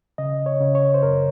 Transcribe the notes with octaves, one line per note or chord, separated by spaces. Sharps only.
C#3 D#5
C#5
C#3
C#5
C5
F#2 A#4